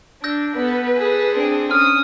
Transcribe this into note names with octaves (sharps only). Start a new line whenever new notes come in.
D4 E6 G6 A#6
B3 A4 B4
G#4 A4
C4 D4
C#4 D#6 F6